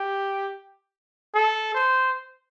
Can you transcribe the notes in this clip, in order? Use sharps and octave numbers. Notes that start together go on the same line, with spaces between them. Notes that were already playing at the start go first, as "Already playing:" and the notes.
Already playing: G4
A4
C5